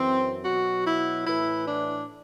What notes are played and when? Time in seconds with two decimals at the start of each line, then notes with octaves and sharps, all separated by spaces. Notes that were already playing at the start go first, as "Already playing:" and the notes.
Already playing: F#2 E3 C4
0.44 B2 F#3 F#4
0.86 E4
1.26 A2 E3 E4
1.67 D4